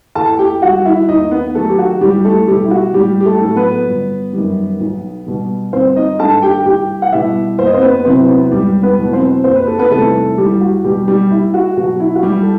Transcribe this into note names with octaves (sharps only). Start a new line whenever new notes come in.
E2 A4 A5
G4 G5
D#3 G3 F#4 F#5
E4 E5
D#2 D#4 D#5
B3 B4
D#3 F#3 A3 A4
G4
F#4
E2 G3 G4
A3 A4
B2 G3 G4
E4
F#4
A1 G3 G4
G4
A3 A4
A2 F#3 A4
B3 B4
G1
F#2 D#3 G3
B1
B2 G3
G1 C4 C5
D#4 D#5
G2 D#3 A4 A5
G4 G5
C2 G4 G5
F#5
B2 G3 E4 E5
F#1 C5
D#5
C4 C5
B3 B4
E2 C3 F#3 C4 C5
B3 B4
E1 G3 G4
B3 B4
E2 B2 F#3
C4 C5
F#1 C5
B4
A4
B3 B4
E2 C3 D#3 G3 A3 A4
E2 G3 G4
F#4
B2 G3 G4
G3 G4
C2 E4
F#4
B2 F#3 F#4
E4
F#4
E2 G3 G4
A4